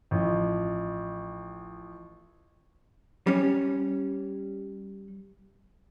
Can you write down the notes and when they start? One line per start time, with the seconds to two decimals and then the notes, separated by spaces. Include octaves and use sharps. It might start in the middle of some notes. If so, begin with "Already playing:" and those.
0.11 A1 F3
3.27 G3 C#4